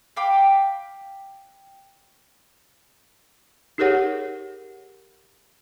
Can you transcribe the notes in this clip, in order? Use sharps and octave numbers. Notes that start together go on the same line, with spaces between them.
F5 G5 B5 D6
D#4 G4 G#4 A#4 C#5 F#5